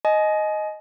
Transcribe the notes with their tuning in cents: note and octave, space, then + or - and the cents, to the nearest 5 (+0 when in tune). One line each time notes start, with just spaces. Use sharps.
D#5 +0 G#5 +35